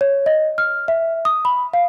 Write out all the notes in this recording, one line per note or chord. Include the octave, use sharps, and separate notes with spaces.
C#5
D#5
F6
E5
D#6
B5
F5